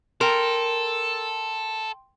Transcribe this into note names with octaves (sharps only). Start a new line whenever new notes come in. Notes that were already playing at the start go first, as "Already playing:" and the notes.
A4 A#4 G5 C6